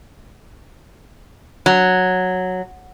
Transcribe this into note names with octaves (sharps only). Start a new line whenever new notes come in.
F#3